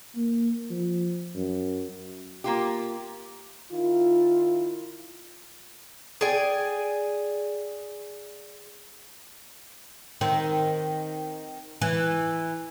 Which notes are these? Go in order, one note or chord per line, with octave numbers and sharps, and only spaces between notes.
A#3
F3
F#2
A#3 F4 G4
D#3 E4 F4
G#4 D5 G5 G#5
D#3 C4
E3